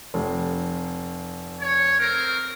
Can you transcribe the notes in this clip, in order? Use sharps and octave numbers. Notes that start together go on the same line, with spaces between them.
F1
C#5
C4 A#4